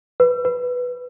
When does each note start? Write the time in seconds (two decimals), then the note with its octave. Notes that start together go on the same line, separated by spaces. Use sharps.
0.20 B4
0.45 B4